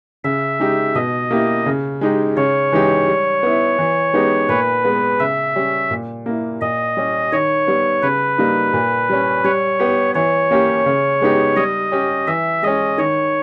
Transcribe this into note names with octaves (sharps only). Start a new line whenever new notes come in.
C#3 E5
G#3 D#4 G4
B2 D#5
A#3 E4 G4
C#3
G#3 D#4 G4
C#3 C#5
E3 G#3 D#4 G4
G3
B3 E4
E3
G#3 B3 D#4 G4
A#2 B4
G#3 B3
C#3 E5
G3 C#4 G4
A#2
A#3 E4
A#2 D#5
G3 C#4 G4
D#3 C#5
G3 B3
C#3 B4
G3 A#3 D#4
A#2
G3 C#4
G3 C#5
B3 G4
E3 C#5
A#3 C#4 G4
C#3
G#3 B3 D#4 G4
G3 D#5
C#4 G4
E3 E5
G#3 C#4 D#5
D#3 C#5